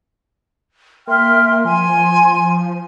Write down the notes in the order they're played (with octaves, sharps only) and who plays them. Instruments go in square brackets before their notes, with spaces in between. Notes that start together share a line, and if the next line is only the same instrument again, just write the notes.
[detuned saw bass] A#3 [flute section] E5 G5 F6 [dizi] C6
[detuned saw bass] F3 [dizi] G#5 [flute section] C6